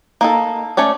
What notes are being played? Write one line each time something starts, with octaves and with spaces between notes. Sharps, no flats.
A#3 D#4 A4
A3 C#4 C#5 D5